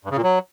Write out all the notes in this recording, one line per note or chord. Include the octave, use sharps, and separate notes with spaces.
G2
C#3
A#2
F#3